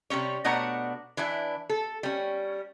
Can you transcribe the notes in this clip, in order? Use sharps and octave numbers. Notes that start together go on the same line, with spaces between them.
C3 G3 C#4 C#5
B2 A3 D4 C#5 F#5 A#5
E3 D4 E4
A4
G3 C#4